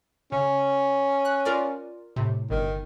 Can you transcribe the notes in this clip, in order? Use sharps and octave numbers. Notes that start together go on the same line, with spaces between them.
C#3 C#4
F#6
F4 A#4 D5
A2 C3
G1 D#3